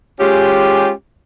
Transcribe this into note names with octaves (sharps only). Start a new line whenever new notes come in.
G#3 C#4 F4 G4